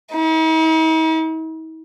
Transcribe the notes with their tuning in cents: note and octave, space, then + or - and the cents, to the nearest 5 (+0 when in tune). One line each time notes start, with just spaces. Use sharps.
D#4 +45